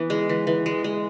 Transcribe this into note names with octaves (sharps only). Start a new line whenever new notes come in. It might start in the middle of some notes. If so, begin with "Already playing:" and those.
Already playing: E3 B3
G#3
E3
E3
G#3
G#3